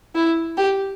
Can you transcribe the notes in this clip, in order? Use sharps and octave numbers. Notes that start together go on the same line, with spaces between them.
E4
G4